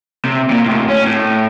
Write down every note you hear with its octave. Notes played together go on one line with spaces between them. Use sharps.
C3
A#2
D2 A2
C#4
A2